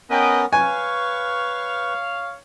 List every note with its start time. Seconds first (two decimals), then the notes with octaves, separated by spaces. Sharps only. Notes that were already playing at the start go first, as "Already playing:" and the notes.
0.10 B3 C#4 A#4 B4 D#5 G5
0.53 B4 C#5 F5 G#5 C#6